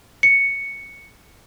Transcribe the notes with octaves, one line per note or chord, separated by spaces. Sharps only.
C#7